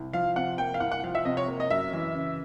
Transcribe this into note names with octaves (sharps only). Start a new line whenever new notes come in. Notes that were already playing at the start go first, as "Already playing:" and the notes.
Already playing: C2
F3 F5
C3 F#5
A#3 G5
F5
C2 F#5
F#5
F3 F5
E5
C3 D#5
C#5
A#3
D#5
F#2 E5
E3
C#3